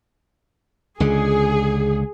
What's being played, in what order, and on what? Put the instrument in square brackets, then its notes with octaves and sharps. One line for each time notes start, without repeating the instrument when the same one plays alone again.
[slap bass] C#2 D3 [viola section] G#4